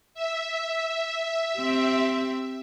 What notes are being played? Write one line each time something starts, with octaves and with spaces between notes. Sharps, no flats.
E5
C4 G4